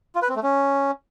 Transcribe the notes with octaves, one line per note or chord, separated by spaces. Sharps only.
F4
B4
C4
A3
C#4